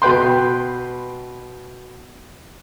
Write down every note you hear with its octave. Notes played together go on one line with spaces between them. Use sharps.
B2 B4 G5 C6